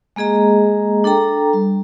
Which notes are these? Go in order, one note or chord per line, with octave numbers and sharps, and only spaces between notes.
G#3 A#3 G#4 D#5 A#5
D4 A4 G5 A#5
G3